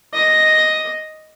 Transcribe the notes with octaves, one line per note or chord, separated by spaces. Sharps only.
D#5